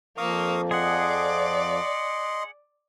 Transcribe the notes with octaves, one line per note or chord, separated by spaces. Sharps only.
F2 F3 A#3 F5 C#6 D#6
G#4 D5 D#5 F#5 C6